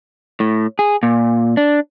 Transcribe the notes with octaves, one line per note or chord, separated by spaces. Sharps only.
A2
G#4
A#2
D4